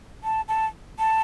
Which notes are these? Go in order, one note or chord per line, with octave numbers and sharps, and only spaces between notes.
A5
A5
A5